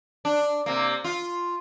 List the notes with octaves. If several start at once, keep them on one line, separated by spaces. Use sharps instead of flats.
D4
C3 A#3
F4